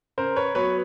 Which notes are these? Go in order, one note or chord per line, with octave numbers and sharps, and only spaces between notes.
C#3 A#4 C5
B4 C#5
F#3 B3 B4 C#5